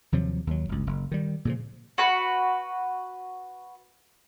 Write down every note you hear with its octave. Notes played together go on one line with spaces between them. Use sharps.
D#2 C3 F3 F#3
D#2 F#3
G1 C#2
F#1
D#3 G3
A#2 C#3 F3
F#4 B4